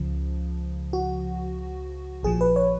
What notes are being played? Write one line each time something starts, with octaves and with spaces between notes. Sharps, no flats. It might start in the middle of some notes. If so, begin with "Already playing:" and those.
Already playing: C#2 C#3 F3
F#4
A#1 A#2 F3 G#4
B4
C#5